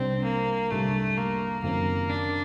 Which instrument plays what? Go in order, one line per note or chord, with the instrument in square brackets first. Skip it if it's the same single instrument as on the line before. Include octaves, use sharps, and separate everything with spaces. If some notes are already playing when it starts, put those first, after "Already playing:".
Already playing: [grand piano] C2 C3 G3 D4 G4 [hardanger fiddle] C4
[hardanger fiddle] A#3
[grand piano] C2 C3 G3 D4 G4 [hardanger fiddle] A3
[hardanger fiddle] A#3
[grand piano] F#1 F#2 D#3 F#3 C4 [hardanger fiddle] A#3
[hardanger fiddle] D4